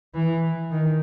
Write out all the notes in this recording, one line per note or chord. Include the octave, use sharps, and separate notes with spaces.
E3
D#3